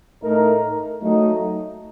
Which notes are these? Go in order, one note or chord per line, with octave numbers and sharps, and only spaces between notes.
A2 A3 D#4 A#4
F#3 A3 D#4